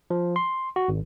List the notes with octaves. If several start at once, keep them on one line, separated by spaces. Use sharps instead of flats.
F3
C6
F#4
G#1